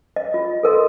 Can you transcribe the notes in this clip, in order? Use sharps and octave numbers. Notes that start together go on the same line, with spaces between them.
D#5
F4
A4 A#4 D#5 C6